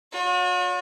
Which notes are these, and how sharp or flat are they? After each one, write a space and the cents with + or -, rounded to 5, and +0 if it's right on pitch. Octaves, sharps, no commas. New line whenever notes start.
F#4 -45 C#5 +35